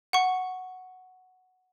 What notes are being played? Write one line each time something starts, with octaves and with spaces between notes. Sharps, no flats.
F#5 C#6